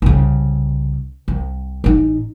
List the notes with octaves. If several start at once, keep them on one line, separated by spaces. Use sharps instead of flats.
C2 C#3
C2
A1 D#4